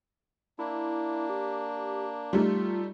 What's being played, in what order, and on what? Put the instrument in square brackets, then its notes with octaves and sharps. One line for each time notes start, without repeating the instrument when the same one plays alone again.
[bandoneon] A#3 D4 [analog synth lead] E4
[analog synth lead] G4
[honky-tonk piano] G3 A3 D#4 [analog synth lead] F4